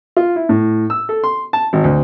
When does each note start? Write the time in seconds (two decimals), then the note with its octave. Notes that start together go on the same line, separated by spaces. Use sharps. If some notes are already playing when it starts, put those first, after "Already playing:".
0.17 F4
0.36 E4
0.49 A2
0.90 E6
1.09 A4
1.24 C6
1.53 A5
1.73 G#1
1.84 D2